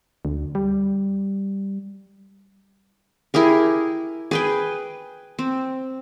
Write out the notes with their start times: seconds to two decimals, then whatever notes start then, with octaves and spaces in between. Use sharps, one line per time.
0.25 D2
0.55 G3
3.34 E4 G4 G#4 A#4
4.31 G#4 B4 G5
5.39 C4